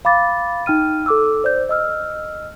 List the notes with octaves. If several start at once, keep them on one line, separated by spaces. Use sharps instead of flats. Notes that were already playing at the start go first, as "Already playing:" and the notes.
F5 B5 D6 A6
D#4 G5 F6 D#7
A4 D6 E6
C5 D5 G6
D#5 E6 F6